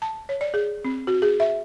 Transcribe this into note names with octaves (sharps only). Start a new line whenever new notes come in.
A5
C#5
D5
G#4
C4
F#4
G#4
E5